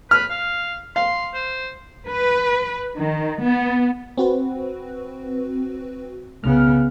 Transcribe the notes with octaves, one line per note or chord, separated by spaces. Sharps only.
B4 F6
F5
F5 C6
C5
B4
D#3
B3
C4 F#4 B4
C2 C#3 B3 F6